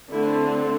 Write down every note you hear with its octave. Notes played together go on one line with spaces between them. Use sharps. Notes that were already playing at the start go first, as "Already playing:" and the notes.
D3 A3 C4 E4